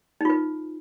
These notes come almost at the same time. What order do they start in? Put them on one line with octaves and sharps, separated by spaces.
D#4 F4 B4